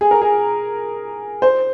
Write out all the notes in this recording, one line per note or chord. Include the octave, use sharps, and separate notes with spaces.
G#4
A#4
G#4
C5